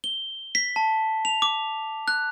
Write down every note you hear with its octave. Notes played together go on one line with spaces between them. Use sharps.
G7
B6
A5
F7
D6
F#6